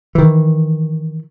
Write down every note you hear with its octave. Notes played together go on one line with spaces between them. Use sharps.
D#3 E3